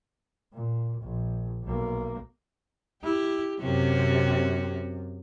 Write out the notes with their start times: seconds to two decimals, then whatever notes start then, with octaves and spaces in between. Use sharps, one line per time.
0.54 A#2
1.02 A#1
1.64 B1 A#3
3.03 E4 G4
3.62 F#2 C3 C#4 F#4 G4